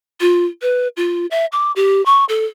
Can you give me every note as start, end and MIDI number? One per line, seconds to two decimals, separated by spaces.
0.21 0.46 65
0.62 0.88 71
0.97 1.26 65
1.31 1.46 76
1.52 1.72 86
1.76 2.04 67
2.06 2.25 85
2.29 2.45 69